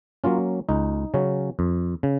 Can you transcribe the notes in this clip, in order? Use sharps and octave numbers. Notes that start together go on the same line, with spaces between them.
F#3 A#3 C#4 F4
C#2 D#4
C#3 F#3 C#4
F2
C#3